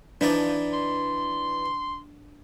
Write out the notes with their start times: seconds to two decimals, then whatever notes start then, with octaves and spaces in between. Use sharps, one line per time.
0.21 E3 F3 D4 D#4 D5
0.73 C6